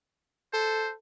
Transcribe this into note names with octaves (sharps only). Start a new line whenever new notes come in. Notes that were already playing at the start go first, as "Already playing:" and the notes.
A4 C5